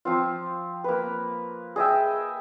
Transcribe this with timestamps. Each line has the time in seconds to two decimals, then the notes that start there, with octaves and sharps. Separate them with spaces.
0.05 F3 C4 F4
0.84 A#3 B4
1.76 G#4 D#5 E5 G5